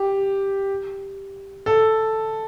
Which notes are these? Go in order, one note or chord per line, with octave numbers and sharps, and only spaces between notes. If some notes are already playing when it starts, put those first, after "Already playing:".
Already playing: G4
A4